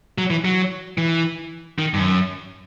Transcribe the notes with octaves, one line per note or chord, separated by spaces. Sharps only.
F#3
E3
F#3
E3
D#3
G2
F#2